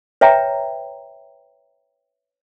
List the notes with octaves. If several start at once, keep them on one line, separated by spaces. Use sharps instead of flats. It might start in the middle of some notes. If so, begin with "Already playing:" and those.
B4 C#5 E5 G5 A#5